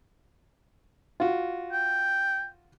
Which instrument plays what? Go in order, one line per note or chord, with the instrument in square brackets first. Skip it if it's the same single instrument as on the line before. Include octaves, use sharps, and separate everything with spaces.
[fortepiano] F4 F#4
[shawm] G5